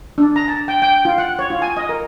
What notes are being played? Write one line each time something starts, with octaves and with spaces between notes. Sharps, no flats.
D4
A#5
A5
G5
G5
F4
F#5
C#5
F4
G#5
D#5
A#4